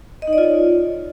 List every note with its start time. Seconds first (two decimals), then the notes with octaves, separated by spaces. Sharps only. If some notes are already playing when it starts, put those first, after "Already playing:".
0.22 D#5
0.27 D#4
0.33 D5
0.38 F4
0.43 C#5